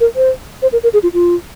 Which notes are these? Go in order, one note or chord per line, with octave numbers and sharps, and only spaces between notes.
A#4
C5
C5
A#4
A#4
G#4
F4
F4